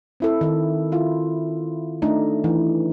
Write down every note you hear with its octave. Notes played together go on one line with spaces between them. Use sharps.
C4 E4 A4
D#3 A4
E4 F4
A3 D4 D#4
E3